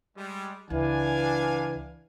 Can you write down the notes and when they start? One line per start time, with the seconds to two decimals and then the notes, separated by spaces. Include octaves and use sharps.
0.18 G3 G#3
0.70 C#2 E3 D4 F5 G#5